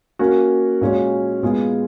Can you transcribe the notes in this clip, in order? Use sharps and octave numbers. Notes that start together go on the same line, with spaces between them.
A#3 C#4 F#4
A#2 G#3 C#4 F#4 C#5
A#2 G#3 B3 F4 G#4